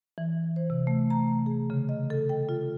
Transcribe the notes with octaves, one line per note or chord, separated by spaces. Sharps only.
E3
C5
C3
A3
A#5
G#4
C#3
D#5
A4
G5
F4